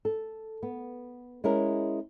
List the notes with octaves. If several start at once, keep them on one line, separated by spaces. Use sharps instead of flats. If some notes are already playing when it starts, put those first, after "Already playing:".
A4
B3
G#3 C#4 E4 A#4